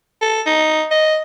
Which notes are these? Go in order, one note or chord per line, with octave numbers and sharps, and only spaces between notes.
A4
D#4
D#5